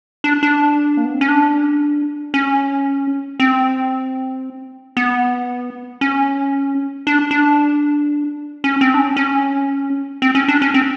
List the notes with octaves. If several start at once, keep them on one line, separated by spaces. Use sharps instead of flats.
D4
D4
A#3
B3
C4
C#4
D4
C#4
C4
B3
C#4
D4
D4
C#4
C4
D4
C#4
C#4
C4
C#4
D4
C#4
C4